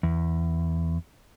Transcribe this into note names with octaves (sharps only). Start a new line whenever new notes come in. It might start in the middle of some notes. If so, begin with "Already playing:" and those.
E2